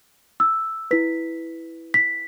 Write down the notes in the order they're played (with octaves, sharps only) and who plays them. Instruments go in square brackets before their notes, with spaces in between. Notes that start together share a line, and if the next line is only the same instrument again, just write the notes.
[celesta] E6
E4 B4 B6
B6